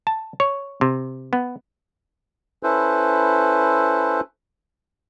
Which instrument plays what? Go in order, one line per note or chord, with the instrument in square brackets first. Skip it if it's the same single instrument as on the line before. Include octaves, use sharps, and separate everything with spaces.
[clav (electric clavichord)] A5
C#5
C3
B3
[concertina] C#4 E4 A4 B4 C5